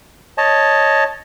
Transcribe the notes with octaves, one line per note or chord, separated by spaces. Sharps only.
C#5 D#5 A5